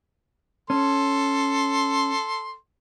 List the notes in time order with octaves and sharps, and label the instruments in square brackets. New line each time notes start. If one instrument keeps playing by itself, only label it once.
[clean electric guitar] C#4 [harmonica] A4 C6